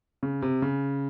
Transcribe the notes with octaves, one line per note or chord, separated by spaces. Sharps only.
C#3
C3
C#3